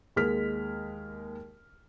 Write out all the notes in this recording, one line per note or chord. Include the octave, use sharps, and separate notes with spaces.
D#2 G#3 G#4 A#4 F6 B6